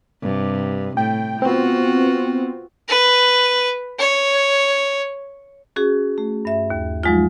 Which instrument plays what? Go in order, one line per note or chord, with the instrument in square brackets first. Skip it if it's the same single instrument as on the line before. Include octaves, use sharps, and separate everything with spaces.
[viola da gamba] G2 C3
[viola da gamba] A2 [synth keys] G5
[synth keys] B3 C4 [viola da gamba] F4 F#4
[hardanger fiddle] B4
C#5
[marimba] C#4 F#4 G#4
A3
G2 E5
D#2
F3 F#3 G#3 D#4 F4